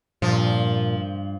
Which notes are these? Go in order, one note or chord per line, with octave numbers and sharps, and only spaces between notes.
G2 A#2 F3